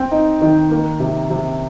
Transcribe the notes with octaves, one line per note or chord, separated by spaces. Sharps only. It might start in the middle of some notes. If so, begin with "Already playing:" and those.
Already playing: C4 G5
D#4
D#3
A#3
C3
C3